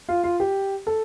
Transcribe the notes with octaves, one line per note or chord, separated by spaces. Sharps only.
F4
F4
G4
A4